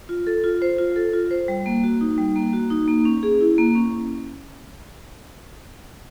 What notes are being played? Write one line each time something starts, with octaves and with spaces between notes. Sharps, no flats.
F4
A4
F4
C5
F4
A4
F4
C5
G3
A#3
F#4
D#4
G3
A#3
F#4
D#4
A#3
C#4
G#4
E4
A#3
C#4